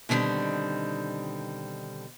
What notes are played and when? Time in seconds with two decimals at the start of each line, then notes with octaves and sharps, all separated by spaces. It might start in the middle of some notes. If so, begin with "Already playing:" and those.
0.09 B2 D3 D#3 G3 C4